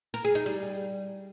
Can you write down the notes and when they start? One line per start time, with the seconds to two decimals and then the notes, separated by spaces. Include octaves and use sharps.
0.14 A#4
0.24 G#4
0.35 D#4
0.46 G3